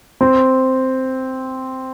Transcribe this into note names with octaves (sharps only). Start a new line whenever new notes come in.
C4